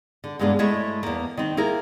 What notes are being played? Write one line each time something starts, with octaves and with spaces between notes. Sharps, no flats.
D3
G2 B2 G#3 A#3 D4
G#3 A3 E4 C#5
E2 A#3
D#3 C4
A#3 E4 G#4 A#4